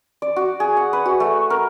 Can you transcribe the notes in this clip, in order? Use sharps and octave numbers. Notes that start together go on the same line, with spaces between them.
D5
F#4
G#4
F#5
B4
F#4
A3
A#4